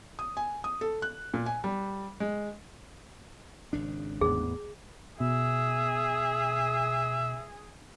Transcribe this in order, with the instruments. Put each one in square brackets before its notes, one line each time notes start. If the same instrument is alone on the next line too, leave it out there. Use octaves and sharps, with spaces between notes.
[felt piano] D#6
G#5
D#6
A4
F#6
A#2
G#5
G3
G#3
[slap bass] G#1 C#3 D4
[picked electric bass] E2 A2 B3 [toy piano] G#4
[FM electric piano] B2 [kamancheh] G#4 [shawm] E5